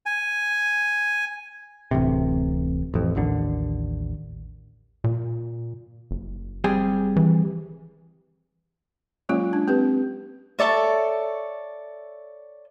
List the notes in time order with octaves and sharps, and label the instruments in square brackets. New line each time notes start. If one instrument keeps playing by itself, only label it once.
[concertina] G#5
[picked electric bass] D1 A1 C3
A1 F2
A1 D#2 D3
[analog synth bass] A#2
F#1
[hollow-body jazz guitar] G3 C4 G#4
[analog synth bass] E3
[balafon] F#3 G#3 A#3 C#4 F4
D4
C4 G4 B4
[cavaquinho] A4 C#5 D5 E5